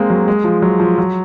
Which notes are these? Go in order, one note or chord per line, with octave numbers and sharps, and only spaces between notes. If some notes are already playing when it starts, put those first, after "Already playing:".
Already playing: G#3 A#3 C4
F#3
G#3
F3
F#3
F3
F#3